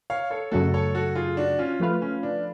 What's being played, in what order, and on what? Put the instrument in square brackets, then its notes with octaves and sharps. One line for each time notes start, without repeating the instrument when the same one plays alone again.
[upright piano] C#5 F5
A4 C#5
[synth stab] F#2 C#3 F#3 A3 [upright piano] F#4 A4
[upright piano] A4 C#5
F#4 A4
F4 G#4
D4 F#4
C#4 F4
[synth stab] F3 A3 F4 B4 F5
[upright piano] C#4
D4